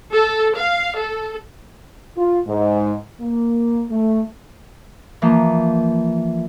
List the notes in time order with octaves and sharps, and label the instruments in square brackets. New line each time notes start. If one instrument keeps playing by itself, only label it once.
[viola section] A4
F5
A4
[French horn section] F4
G#2
A#3
A3
[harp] E3 F3 A#3